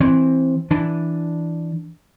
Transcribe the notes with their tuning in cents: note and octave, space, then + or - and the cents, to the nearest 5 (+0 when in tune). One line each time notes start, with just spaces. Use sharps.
E3 +0 C4 +10
E3 +0 D4 +0